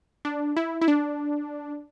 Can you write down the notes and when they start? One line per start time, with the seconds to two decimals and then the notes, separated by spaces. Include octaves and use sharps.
0.25 D4
0.57 E4
0.81 E4
0.88 D4